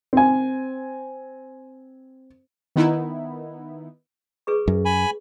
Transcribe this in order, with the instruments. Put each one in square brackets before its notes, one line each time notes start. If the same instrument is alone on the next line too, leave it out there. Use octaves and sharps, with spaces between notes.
[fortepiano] C4 G#5
[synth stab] D#3 B3 D#4 E4
[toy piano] G#4 B4 C#6
[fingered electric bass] F#2
[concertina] G#5 B5